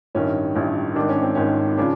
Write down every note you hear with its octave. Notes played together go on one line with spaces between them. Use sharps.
A1 G2 D#3 C#4
A1 G2 D#3
G#1 G#2 D#3 D4
C#4
C4
G#1 G#2 D#3 C#4
C#3 F3 D4